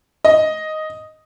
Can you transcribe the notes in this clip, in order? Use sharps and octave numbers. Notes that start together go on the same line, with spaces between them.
D#5